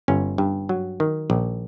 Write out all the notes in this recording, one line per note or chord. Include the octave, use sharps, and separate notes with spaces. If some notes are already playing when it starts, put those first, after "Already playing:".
G1 C#4
G2
F#3
D#3
A#1